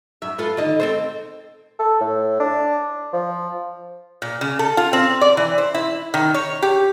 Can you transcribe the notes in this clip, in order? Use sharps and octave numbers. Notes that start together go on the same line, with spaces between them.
F#2 E5
F4 A4 B4
D3 D#3 D#5
C4 A4 C5
A4
A2
D4
F3
A#2
C#3
A4
F4
C4
D5
E3
C5
E4
D#3
C#5
G4